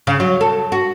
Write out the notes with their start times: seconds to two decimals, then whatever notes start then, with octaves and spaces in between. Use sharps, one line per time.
0.07 C#3
0.20 F#3
0.41 A4
0.72 F#4